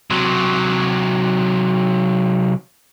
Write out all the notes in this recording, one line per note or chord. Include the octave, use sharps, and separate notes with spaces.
C3 F#3